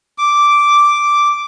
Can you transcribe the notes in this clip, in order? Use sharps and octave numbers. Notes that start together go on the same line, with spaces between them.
D6